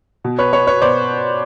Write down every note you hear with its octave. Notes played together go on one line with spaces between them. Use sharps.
B2
B4 C#5
B4 C#5
B4 C#5
B2 C5 D5